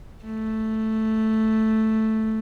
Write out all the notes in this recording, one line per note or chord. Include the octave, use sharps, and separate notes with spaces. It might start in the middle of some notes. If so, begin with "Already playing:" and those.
A3